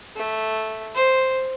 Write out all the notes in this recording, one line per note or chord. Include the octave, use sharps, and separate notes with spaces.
A3
C5